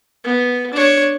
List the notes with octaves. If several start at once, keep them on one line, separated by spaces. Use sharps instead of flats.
B3
D4 C#5